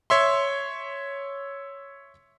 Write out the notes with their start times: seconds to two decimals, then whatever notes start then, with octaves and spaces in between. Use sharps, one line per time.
0.10 C#5 E5 C6